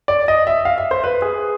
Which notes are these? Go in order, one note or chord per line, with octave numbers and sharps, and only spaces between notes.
D5
D#5
E5
F5
E5
C5
B4
G#4